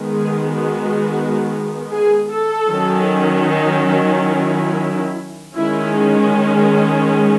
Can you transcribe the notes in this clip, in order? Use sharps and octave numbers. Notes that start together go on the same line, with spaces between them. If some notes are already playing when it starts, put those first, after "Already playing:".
Already playing: D#3 G#3 B3
G#4
F#4
G#4
A4
D#3 F#3 C#4
D#4
E4
D#3 G#3 C#4 E4